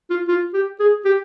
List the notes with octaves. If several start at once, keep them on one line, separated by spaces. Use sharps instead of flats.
F4
F4
G4
G#4
G4